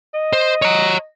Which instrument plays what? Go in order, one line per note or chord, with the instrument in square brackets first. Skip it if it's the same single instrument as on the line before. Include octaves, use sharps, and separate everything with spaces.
[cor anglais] D#5
[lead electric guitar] C5
C#5 A#5